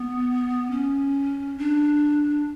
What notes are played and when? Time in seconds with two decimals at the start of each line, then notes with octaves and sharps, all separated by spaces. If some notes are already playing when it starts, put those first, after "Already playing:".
Already playing: B3
0.71 C#4
1.58 D4